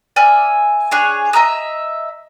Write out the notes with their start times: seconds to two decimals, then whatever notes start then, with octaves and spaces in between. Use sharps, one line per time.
0.16 D5 E5 G#5 F6
0.91 D4 G#4 C#5
1.33 D#5 E5 A#5 D#6